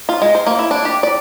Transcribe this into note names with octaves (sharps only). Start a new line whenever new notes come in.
F4
G#3
C5
A#3
E4
D4
G4
D5